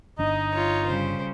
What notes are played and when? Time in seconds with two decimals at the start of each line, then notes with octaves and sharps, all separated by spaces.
0.19 G1 D4 D#4 D#5
0.54 F4 C#5
0.87 C#3 G3 C5